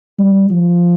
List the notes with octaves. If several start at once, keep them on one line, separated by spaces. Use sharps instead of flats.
G3
F3